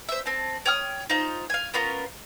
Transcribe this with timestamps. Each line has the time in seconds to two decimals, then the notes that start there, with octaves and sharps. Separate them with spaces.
0.09 C5 E5
0.26 C4 A5
0.66 C#5 G5 D#6 F6
1.10 D#4 F4 C5
1.50 F5 G#5
1.74 B3 C#4 F4 A#4